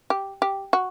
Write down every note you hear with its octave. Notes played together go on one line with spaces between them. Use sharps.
G4
G4
F#4